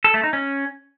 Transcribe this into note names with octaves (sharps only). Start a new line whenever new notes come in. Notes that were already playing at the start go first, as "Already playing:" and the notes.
A4
A3
D#4
C#4